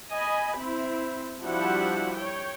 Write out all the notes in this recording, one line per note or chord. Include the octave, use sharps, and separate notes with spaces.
D#5 G#5 B5
C4 E4
F3 G3 D4 E4 F#4 F#5
C#5 G5